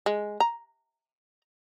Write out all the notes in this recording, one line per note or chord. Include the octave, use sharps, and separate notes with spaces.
G#3
A#5